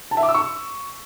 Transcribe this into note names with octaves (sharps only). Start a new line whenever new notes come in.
A5
E5
D6
E6
C#6